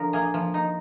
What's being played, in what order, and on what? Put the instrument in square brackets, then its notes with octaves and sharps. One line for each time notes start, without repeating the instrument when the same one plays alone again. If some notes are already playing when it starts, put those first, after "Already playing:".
Already playing: [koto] D3 F3 A#4
A#3 G#4
F3
D#4